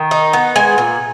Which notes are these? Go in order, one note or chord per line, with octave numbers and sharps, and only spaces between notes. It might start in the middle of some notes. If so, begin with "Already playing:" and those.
Already playing: D#3
D#4
B3
G#3 G#5
A#2